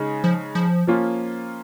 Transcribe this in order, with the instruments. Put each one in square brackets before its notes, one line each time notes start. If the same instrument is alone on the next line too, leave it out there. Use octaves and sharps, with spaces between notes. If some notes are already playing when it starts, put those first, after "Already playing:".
Already playing: [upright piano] C#3 G#3 D#4
[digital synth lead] F3
F3
[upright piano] F3 A#3 C#4 F4